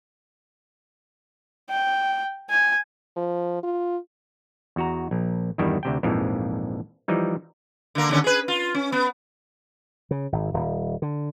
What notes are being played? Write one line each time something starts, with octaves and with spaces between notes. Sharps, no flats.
G5
G#5
F3
F4
E2 F#4 A#5
A#1
E2 G2 D#3 G3 E4
D2 C3 G5
A#1 F2 G#2 E3 F3
E3 F3 G3 D#4
D3 A#3
D#2 D3 C#4
G#4 B4
F4
C#4
B3
C#3
G#1
D#1
D3